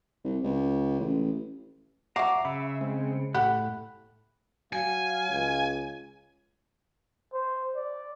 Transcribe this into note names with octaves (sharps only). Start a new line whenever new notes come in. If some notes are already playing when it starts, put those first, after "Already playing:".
C2
C#2
A1
F#3 F#4 E5 A#5 D6 C7
C#3 E5 B5
G#3 C4
A2 A3 G4 F#5 B5 F#6
F#3 F5 G#5
C#2
C5
D5